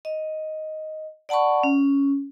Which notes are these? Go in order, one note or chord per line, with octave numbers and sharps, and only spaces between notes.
D#5
D5 F#5 A5 B5 C#6
C#4